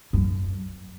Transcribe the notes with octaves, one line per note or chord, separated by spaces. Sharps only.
F#2